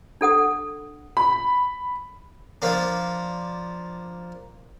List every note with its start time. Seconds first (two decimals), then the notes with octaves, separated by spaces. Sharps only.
0.21 D4 A4 F#5 D#6
1.17 B5
2.62 F3 A#3 D4